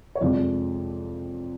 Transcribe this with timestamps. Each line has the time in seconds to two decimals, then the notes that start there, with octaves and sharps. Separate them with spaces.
0.15 C#5
0.21 F2 C3 F3 G#3 D5